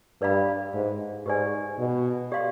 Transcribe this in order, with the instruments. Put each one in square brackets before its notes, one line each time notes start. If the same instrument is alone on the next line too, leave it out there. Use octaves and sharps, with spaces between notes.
[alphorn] G2 [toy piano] B4 D5 F5 B5
[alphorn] G#2
[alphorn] G#2 [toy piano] G4 B4 D5 G#5
[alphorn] B2
[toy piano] G4 D5 F5 C6